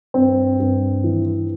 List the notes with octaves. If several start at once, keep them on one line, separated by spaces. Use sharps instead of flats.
G2 C4
G2
E3